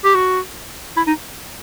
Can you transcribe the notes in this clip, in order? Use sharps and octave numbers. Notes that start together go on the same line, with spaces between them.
G4
F#4
E4
D#4